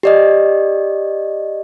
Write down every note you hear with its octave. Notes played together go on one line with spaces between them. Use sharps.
G4 D5 D#5